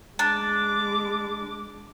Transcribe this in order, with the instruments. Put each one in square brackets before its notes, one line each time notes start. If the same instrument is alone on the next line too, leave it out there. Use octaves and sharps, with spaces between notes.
[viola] G#3 D6 [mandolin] D4